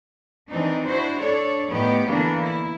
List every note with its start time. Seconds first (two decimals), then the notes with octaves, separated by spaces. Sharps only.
0.49 D#3 E3 C4 D4 D#4
0.85 D4 E4 F#4 C5
1.19 D4 A4 C#5 D5
1.68 A2 D#3 B3 G4
2.06 D3 E3 A#3 B3 D4
2.42 E4